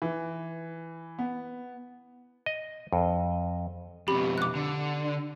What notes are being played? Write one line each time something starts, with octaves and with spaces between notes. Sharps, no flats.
E3
B3
D#5
F2
F2 B2 G4 B5
D6 F#6
D3